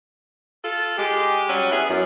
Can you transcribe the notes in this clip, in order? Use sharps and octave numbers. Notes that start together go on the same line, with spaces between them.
F4 A4
G#3 G4
F#3 G3 C#4
B3 E4 G#4
F#2